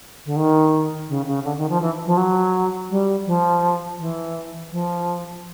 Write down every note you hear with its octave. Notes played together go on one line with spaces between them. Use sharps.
D3
D#3
C#3
C#3
D3
D#3
F3
E3
F3
F#3
G3
F3
E3
F3